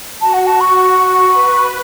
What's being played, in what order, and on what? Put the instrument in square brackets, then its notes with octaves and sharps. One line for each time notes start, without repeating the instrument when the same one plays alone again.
[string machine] F#4 [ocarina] A5
[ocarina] F#5
A5
C#6
[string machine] B4